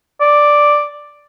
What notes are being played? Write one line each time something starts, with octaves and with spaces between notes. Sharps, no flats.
D5